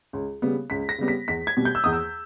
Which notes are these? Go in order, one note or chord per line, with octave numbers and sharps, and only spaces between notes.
C#2
C#3 G3 B3
C#2 B6
A#6
C#3 G3 B3
B6
E2 B6
G#6
B2 G3
G6
E6
E2 D#6
E6